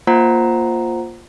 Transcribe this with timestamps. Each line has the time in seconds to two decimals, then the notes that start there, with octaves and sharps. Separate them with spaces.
0.07 A#3 F4 C5 F#5 A#5